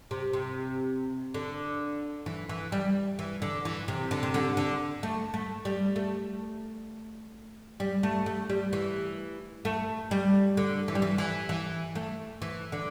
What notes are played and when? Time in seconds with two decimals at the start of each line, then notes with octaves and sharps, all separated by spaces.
0.11 C3
0.33 C3
1.34 D3
2.26 E3
2.49 E3
2.72 G3
3.19 E3
3.42 D3
3.65 E3
3.88 C3
4.11 D3
4.23 C3
4.34 D3
4.57 D3
5.03 A3
5.34 A3
5.65 G3
5.96 A3
7.80 G3
8.03 A3
8.26 A3
8.50 G3
8.73 E3
9.65 A3
10.11 G3
10.57 D3
10.88 E3
10.95 G3
11.02 E3
11.18 E3
11.49 E3
11.95 A3
12.42 E3
12.72 D3